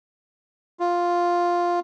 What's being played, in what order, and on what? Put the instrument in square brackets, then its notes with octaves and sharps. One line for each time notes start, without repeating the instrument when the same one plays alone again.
[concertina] F4